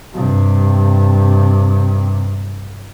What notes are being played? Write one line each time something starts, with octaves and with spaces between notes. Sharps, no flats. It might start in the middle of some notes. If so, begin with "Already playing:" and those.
G2 C3